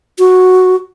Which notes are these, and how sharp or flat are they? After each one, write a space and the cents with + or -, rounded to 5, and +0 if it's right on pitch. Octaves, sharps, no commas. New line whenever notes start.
F#4 -5